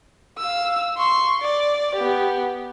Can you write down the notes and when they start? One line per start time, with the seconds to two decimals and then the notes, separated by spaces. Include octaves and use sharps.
0.38 F5 E6
0.98 C6 C#6
1.41 D5
1.95 B3 G4